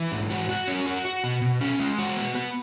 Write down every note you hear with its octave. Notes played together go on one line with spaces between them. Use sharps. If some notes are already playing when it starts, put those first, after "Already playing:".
Already playing: E3
G#2
F#4
F#4
C#4
F#4
F#4
B2
B2
C#4
G#3
F#4
B3
B3